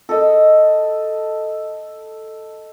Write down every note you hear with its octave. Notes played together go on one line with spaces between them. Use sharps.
A4 D#5